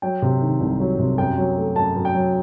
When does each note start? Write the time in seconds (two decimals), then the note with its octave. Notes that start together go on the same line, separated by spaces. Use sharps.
0.02 F#3 G5
0.22 C3
0.41 D#3
0.61 C2
0.80 F#3
0.99 C3
1.18 F#2 G5
1.38 F#3
1.57 A3
1.76 F#2 A5
1.96 F#2
2.05 G5
2.14 F#3